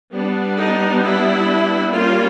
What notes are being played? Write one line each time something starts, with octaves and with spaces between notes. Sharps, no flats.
G3 B3 D4
D#4
E4
G3 A#3 C#4 F4